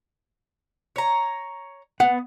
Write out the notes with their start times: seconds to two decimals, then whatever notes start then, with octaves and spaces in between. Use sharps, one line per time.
0.96 C#5 A#5
2.00 B3 F#5